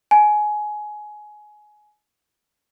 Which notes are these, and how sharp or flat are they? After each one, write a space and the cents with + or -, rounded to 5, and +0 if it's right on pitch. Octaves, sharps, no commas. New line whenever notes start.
G#5 +20